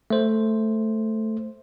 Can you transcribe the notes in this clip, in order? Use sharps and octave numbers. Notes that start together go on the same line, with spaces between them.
A3 C5